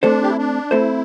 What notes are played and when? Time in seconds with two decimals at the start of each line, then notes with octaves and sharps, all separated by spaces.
0.03 A3 C4 D4 A4 C5
0.23 G4
0.30 E4
0.38 D4
0.71 A3 C4 E4 A4 C5